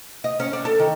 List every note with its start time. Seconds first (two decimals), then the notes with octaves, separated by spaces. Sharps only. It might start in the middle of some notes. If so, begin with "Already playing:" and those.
0.24 D#5
0.40 C#4
0.53 D4
0.65 A4
0.80 D#3